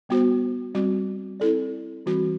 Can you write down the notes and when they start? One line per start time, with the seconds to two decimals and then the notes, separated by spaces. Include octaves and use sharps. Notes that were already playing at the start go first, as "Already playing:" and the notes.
0.09 G3 B3 F#4 C5
0.74 G3 C4 F#4
1.40 C4 E4 A4 D5
2.06 E3 G3 C4 F#4